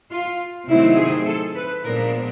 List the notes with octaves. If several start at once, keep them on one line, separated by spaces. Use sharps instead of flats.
F4
C3 D#3 F#3 A3 C4 E4
G#4
A4
B4
A#2 F3 G#3 B3 D4 A#4